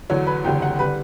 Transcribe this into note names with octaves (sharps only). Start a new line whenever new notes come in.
E2 D3 F#3 C#5
B4
F#1 E2 D3 G3 G5
F#5
D3 G3 B4